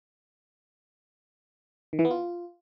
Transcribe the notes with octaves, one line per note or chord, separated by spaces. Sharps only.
D#3
E3
B3
F4